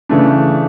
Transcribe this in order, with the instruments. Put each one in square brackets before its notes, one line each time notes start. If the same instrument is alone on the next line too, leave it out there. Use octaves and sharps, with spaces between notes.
[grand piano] C#3 E3 A3 D4